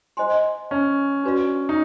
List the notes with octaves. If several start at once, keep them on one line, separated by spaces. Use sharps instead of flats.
C5 D#5 G#5 C6
C#4
D4 F#4 B4 D5 F5
D#4